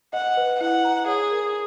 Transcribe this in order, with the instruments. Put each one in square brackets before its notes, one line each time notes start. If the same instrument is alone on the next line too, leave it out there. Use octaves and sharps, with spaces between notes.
[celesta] D#5 [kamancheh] F#5
[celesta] B4
[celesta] E4 [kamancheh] F#5
[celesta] A#5
[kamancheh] G#4 [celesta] C#5
[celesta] A#4